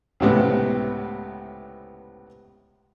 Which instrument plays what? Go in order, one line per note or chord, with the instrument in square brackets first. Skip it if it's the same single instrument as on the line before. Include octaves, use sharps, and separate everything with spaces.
[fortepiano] C#2 A2 C3 B3